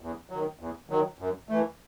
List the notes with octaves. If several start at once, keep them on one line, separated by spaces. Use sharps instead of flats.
E2
D#3 F#3
E2
D#3 F#3
F#2
E3 A3